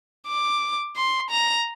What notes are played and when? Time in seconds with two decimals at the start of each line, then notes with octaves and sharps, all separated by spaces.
0.27 D6
0.96 C6
1.30 A#5